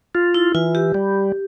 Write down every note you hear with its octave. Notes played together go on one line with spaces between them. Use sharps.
F4
E4
E3 F4
G4
G3